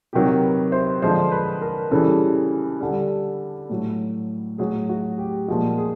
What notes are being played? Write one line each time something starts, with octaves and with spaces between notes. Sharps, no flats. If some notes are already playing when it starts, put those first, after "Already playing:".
C3 D#3 F#3 G4
B4
C5
D3 F3 G#3 C5
B4
A#4
C#3 E3 G3 A4
D3 G3
A2 F#3
A2 F#3 G#4
F#4
G4
A#2 F3 G#3 F#4
G#4